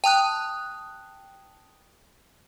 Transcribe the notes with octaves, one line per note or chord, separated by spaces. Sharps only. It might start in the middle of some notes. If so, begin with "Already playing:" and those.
G5 A5 D#6 F#6